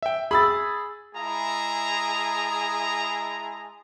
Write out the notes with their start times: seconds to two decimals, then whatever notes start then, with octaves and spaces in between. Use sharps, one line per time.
0.03 E5 G5
0.31 G#4 B5 E6 A6
1.15 G#3 E4 G#4 A5 A#5